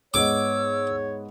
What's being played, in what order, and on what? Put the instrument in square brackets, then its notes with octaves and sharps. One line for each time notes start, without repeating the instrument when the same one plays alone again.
[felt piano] G#2 B3 D#5 [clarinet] C#5 [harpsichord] D6 [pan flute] E6